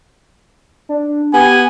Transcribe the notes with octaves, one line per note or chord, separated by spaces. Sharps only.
D4
B3 G4 G#5